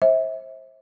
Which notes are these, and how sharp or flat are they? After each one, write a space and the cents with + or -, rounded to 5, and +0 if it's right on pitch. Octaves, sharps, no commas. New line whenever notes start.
C5 +25 E5 -25